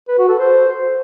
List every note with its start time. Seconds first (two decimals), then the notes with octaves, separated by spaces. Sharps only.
0.08 B4
0.18 F#4
0.29 A4
0.39 C5